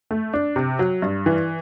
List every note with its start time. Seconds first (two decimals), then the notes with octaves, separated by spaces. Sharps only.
0.11 A3
0.34 D4
0.56 C3
0.79 F#3
1.02 G2
1.26 E3